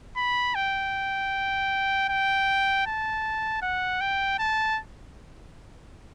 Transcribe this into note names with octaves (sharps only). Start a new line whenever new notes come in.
B5
G5
G5
A5
F#5
G5
A5